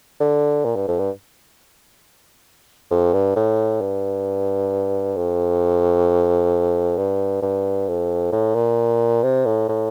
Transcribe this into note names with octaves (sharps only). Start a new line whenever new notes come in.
D3
A#2
G2
F2
G2
F2
G2
A2
G2
F2
G2
G2
F2
A2
A#2
C3
A2
A2